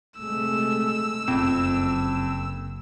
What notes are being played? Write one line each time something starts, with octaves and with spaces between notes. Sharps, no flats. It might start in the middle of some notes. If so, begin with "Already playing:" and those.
C3 G#3 A3 E6
F#1 F2